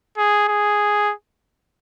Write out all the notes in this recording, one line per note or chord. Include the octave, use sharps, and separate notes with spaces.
G#4
G#4